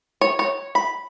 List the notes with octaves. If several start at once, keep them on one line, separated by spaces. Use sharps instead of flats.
C#5
C#5
B5